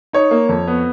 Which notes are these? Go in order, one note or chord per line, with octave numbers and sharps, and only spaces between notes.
D#4 C#5
A#3
F2
B3